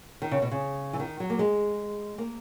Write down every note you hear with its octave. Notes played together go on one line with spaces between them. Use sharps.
D#3
C#3
B2
C#3
E3
D#3
F#3
A#3
G#3
A#3